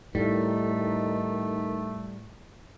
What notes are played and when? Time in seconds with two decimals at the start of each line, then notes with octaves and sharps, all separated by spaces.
0.15 A2 D#3 G3 A3